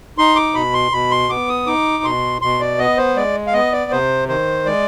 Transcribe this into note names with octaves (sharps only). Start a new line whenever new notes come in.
D#4 C6
D6
B2 B5
C6
B2 B5
C6
B3 D6
D#6
D#4 D6
B2 C6
B2 C6
D5
B3 D#5
C5
G#3 D5
F5
B3 D#5
D5
C3 C5
D#3 C5
G#3 D5